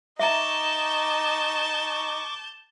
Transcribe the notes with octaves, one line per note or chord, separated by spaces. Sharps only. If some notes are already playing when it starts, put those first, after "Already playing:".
D#4 E5 A5 A#5 C#6 D6 G6